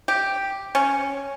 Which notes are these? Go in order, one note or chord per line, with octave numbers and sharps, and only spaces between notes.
G4
C#4